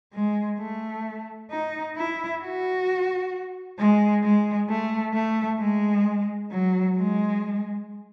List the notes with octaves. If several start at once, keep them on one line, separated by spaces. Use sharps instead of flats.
G#3
A3
D#4
E4
F#4
G#3
G#3
A3
A3
G#3
F#3
G#3